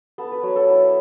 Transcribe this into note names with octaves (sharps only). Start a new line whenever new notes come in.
B3 A4
B4
F#3 C#5
A4
E4